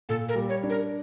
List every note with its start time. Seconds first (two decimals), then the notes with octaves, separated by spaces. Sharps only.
0.09 A#2 A4
0.29 A#4
0.35 G3
0.49 C#5
0.63 D4
0.70 A#4